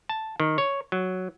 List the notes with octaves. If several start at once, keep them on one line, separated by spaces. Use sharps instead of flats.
A5
D#3
C#5
F#3